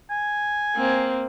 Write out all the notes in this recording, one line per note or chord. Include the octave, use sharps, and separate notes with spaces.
G#5
A#3 C4